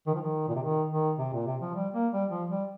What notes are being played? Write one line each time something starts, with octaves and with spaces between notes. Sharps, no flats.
D#3
F3
D#3
A#2
C3
D#3
D#3
C3
A#2
C3
F3
G3
A#3
G3
F3
G3